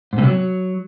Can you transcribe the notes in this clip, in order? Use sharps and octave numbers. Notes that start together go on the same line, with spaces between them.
G#2
C3
F#3